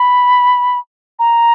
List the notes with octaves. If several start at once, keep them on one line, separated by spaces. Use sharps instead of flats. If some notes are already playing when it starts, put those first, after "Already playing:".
Already playing: B5
A#5